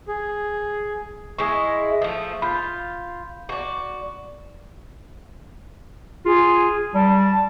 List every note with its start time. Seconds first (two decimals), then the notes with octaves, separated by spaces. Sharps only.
0.08 G#4
1.39 G#3 E4 C#6 D#6
2.02 F3 A3 D#6
2.42 F4 B5 G6
3.49 F#4 D5
6.26 F4 G#4
6.95 G3 A5